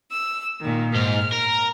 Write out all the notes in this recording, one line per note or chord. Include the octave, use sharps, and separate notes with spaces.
E6
A#2 D#3
G#2 F6
A#4